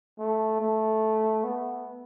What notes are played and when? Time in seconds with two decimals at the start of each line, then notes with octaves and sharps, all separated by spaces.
0.19 A3
0.60 A3
1.44 B3